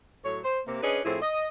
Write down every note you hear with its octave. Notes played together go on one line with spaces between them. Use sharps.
A2 F#3 C#5
C5
C3 A#3
C#4 D4 G#4 B4 D#5
A2 F3 C4 E4 G#4
D#5